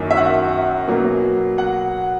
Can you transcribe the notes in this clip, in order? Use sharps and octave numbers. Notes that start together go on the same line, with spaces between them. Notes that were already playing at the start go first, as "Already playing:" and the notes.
Already playing: F#2 D#3 A#3 E4
E5
F#5
B2 F#3 A#3
F#5